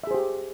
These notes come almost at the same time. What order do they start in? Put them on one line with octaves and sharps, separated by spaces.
E5 G#4 C5 G4